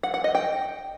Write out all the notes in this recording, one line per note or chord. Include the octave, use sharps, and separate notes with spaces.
F#5
F#5
D#5
G5